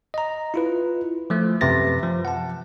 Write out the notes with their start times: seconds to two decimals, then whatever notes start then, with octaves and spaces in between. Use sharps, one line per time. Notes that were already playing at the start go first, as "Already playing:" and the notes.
0.14 D#5 A#5
0.54 E4 F4 B4
1.30 F3 A3
1.61 F#2 C3 B4 E5 A6 A#6
2.03 F3
2.25 F#5 A5